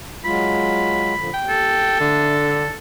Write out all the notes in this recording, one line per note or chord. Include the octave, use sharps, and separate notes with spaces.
F#3 G#3 F4 B5
A#2 D3 F3
D#2 G5
A4
D3 D4 E5
D4